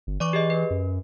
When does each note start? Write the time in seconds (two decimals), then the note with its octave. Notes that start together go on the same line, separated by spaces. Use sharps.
0.07 G1
0.20 E3 D5 C#6 D6
0.33 G4 G#4 D#5
0.50 B4
0.70 F#2